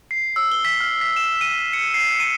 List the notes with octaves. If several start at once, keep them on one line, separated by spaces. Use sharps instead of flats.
C7
E6
G7
B6
F6
B6
E7
D#7
C#7
C7
D#7